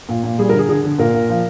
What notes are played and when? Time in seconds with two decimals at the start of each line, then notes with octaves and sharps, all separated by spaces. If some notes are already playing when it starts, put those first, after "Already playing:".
0.09 A#2
0.24 A#2
0.38 G3 G#4
0.49 A#4
0.53 D3
0.59 G#4
0.69 D3 G#4
0.84 D3
0.99 A#2 A#4
1.14 A#2
1.29 F3